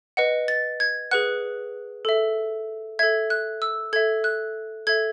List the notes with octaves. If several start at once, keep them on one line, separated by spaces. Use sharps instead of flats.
B4 D#5 F#5
A6
G#6
G#4 B4 F#5 F#6
A4 E5
A4 E5 G#6
F#6
E6
A4 E5 G#6
F#6
A4 E5 G#6